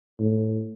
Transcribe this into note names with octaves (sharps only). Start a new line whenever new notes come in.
A2